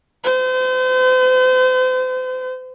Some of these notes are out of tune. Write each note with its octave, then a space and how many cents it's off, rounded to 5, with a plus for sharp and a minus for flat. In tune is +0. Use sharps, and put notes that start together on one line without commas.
C5 -40